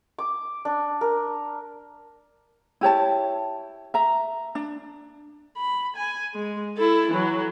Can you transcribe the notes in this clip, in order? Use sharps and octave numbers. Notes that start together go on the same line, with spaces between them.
D6
D4
A#4
E4 G4 C#5 A5
E5 A#5
D4
B5
G#5
G#3
E4 A4
E3 F#3